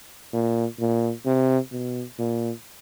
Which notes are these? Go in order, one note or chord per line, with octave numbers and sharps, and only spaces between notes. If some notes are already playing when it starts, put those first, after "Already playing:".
A#2
A#2
C3
B2
A#2